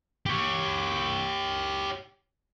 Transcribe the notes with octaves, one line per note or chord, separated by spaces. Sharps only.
G4 C#5